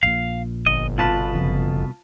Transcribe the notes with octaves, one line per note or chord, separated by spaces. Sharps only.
A#1 A#2 F5
G1 D#5
C2 B2 F4 B4 A5
F#1 C#3 F3